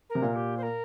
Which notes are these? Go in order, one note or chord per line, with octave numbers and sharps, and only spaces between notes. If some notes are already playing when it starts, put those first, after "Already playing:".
A#4
C3
A#2
G4
C5
A#4